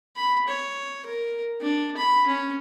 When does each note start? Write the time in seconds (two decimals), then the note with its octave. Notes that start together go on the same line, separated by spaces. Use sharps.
0.16 B5
0.48 C#5
1.06 A#4
1.61 D4
1.97 B5
2.27 C#4